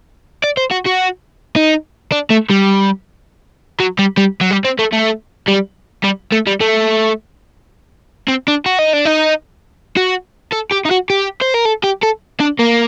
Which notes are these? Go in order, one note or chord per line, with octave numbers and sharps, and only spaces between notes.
D5
C5
F#4
F#4
D#4
D4
A3
G3
F#3
G3
G3
F#3
G3
C4
A3
A3
G3
G3
A3
G3
A3
C4
D4
F#4
D#4
D4
D#4
F#4
A4
G4
D#4
F#4
G4
C5
A#4
A4
G4
A4
D4
A#3